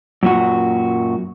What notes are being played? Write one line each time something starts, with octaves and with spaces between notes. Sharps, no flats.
F#2 A#2 F#4